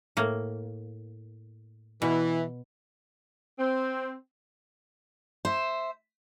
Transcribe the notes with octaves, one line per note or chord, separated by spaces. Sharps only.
A2 A#3
B2 E3
C4
C5 E5